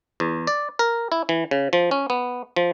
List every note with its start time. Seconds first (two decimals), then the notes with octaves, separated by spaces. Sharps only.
0.20 E2
0.47 D5
0.79 A#4
1.12 E4
1.29 E3
1.51 C#3
1.73 F3
1.91 C#4
2.10 B3
2.56 F3